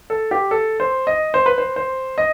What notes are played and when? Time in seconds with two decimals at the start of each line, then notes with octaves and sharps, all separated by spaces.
0.10 A4
0.31 G4
0.51 A4
0.80 C5
1.07 D#5
1.34 C5
1.46 B4
1.58 C5
1.76 C5
2.18 D#5